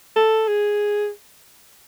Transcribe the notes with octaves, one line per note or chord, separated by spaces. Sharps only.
A4
G#4